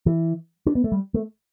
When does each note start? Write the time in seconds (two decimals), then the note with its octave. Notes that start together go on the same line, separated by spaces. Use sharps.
0.06 E3
0.66 D4
0.75 B3
0.84 A3
0.92 G3
1.14 A3